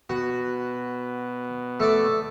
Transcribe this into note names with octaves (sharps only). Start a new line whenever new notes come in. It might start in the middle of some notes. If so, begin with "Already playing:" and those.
B2 F#4
A3 D5